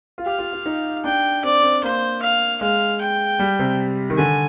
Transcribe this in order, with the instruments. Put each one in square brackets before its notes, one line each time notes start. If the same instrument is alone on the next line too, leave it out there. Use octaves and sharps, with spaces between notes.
[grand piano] F4
[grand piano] G4 [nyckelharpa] F5
[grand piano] F4
F4
D#4
[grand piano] D4 [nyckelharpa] G5
[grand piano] C4 [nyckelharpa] D5
[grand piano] C4
[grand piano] A#3 [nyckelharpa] C5
[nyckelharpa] F5
[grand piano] G#3 [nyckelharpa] F5
[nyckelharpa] G5
[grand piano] G3
C3
D#3
[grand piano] D3 [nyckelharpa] G#5